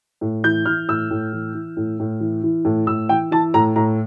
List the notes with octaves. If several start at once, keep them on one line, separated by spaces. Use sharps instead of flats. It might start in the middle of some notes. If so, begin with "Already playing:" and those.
A2
E3 G6
E3 F6
A2 E6
A2
E3
E3
A2
A2
E3
E3
A2
A2 E6
E3 G5
E3 A5
A2 A#5
A2 A#5